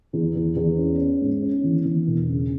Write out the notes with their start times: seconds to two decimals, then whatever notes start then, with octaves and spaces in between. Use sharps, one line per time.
0.13 E2
0.35 E2
0.56 E2
0.78 C#4
0.99 C#4
1.21 G#2
1.43 C#4
1.64 E3
1.85 E3
2.07 E1
2.28 C#3